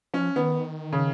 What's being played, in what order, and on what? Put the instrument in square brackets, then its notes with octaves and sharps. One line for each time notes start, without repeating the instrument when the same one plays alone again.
[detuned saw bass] F3 [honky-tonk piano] C#4
[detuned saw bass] D#3 [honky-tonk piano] B3
[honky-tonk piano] C#3